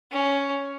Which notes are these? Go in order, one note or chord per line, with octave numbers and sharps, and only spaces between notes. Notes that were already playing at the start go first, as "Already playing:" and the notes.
C#4